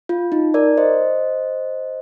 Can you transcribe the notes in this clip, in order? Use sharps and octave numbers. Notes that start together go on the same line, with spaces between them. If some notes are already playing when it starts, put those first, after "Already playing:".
F4
D#4
A#4 D5
C5 D#5